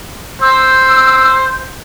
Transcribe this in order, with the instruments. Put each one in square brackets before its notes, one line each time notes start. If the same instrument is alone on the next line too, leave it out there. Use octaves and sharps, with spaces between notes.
[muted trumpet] C5 [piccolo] E6